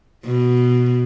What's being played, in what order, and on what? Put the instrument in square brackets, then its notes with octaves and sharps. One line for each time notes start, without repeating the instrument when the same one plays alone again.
[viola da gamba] B2